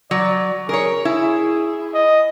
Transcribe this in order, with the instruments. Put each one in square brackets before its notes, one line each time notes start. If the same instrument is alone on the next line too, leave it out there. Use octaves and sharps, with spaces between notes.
[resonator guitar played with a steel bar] F#3 [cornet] D5
[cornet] G#4 [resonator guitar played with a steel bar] A#4 C#5
[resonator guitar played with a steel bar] E4 [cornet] G#4
[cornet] D#5